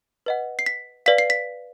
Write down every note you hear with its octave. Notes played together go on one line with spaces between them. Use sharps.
B4 D#5 F#5
C7
B6
B4 D5 F5 B6
C7
B6